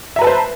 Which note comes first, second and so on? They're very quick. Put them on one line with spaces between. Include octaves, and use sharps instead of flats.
E5 A#5 B4 A5 C5